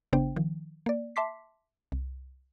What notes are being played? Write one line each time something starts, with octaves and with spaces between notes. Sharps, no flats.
G#1 C#3 B3 D4 C5 G5
D#3 F3
A#3 D5
E5 A5 C6 D6 B6 C7
C2